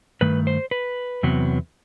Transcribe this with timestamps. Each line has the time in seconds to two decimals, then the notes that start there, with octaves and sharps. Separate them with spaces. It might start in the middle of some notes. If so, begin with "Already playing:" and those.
0.21 G2 D#3 A3 B4
0.47 C5
0.71 B4
1.23 E2 C3 F#3 B3